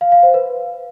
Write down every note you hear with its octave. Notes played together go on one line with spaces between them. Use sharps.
F5
F5
C5
B4